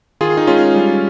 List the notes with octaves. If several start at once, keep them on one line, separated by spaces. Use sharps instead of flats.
D#3 F4 G#4
D#4
G#3 C#4 F4
G3